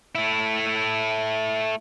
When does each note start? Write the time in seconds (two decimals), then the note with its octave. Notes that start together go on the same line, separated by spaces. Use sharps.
0.15 A3 E4